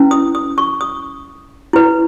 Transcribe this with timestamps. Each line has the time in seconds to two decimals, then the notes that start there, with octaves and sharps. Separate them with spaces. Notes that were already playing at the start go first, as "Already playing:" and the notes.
Already playing: C#4 E4 B4
0.11 D#6
0.35 D#6
0.58 C#6
0.81 D#6
1.73 E4 B4